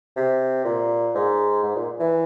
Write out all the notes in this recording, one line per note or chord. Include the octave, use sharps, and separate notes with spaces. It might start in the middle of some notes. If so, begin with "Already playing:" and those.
C3
A#2
G#2
G#2
A#2
E3